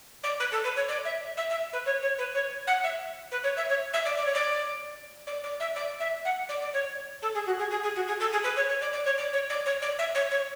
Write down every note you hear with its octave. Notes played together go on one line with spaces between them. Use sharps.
D5
B4
A4
B4
C#5
D5
E5
E5
E5
B4
C#5
C#5
B4
C#5
F#5
E5
B4
C#5
E5
C#5
E5
D5
D5
C#5
D5
D5
D5
E5
D5
E5
F#5
D5
D5
C#5
A4
G#4
F#4
G#4
G#4
G#4
F#4
G#4
A4
G#4
B4
C#5
C#5
D5
D5
C#5
D5
C#5
D5
C#5
D5
E5
C#5
C#5